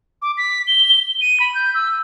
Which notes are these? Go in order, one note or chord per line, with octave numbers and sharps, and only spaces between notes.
D6
B6
G7
D#7
B5
G6
E6